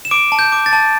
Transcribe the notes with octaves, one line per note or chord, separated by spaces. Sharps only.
E7
D6 D7
A5
G6
D6
A6
A5